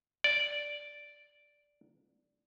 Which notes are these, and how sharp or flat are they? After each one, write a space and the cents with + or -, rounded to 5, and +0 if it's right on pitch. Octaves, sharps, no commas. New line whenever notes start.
D5 -5